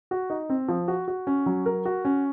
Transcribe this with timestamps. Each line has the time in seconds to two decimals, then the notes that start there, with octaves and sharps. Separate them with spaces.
0.11 F#4
0.30 D#4
0.50 C4
0.68 F3
0.88 F#4
1.08 F#4
1.27 C#4
1.46 F#3
1.66 A#4
1.85 F#4
2.05 C#4